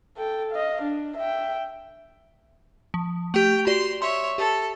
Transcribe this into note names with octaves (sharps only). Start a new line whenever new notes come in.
A4 G5
D#5 F5
D4
E5 G5
F3
A3 G4 G5
F#4 G4 D5 C6
C#5 E5 C6
G4 A4